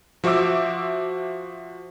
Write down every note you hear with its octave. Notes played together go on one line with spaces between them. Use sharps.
F3 F#4 C5 E5 D6 E6